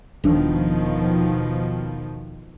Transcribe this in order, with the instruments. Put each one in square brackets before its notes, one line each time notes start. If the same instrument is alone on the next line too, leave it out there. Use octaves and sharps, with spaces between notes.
[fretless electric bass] D#1 D4 [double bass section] B2 D#3 F3